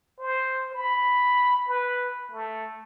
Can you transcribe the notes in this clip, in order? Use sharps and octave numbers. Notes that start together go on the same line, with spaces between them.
C5
B5
B4
A3